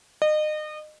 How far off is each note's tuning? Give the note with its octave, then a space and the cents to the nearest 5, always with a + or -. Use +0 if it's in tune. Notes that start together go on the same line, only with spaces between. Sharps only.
D#5 -30